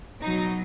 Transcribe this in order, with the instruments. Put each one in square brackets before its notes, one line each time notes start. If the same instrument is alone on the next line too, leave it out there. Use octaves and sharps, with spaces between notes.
[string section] B2 F#3 D#4